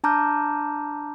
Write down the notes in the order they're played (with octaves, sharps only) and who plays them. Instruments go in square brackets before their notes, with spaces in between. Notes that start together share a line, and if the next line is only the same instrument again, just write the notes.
[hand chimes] D4 A5 A#5 D6 F6 G6